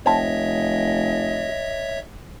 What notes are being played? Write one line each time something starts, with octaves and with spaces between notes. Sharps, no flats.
F1 C4 C#5 D#5 E5 A5